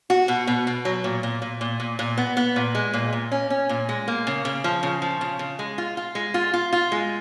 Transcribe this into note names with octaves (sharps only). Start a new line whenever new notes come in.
F#4
B2
B2
B2
F#3
A#2
A#2
A#2
A#2
A#2
A#2
B3
B3
A#2
G#3
A#2
A#2
C#4
C#4
A#2
G#3
A#3
C#3
C#3
F3
C#3
F3
C#3
C#3
G#3
F4
F4
G#3
F4
F4
F4
G#3